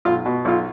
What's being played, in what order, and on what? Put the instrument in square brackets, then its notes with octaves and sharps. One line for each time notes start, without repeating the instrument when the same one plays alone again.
[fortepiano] B1 F4
B2
B1 F4